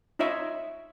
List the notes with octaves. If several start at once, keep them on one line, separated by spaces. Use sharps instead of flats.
D#4 F4 C#5 D#5 E5